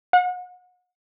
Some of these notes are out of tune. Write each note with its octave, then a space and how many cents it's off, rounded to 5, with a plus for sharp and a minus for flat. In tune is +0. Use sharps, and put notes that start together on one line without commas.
F#5 -35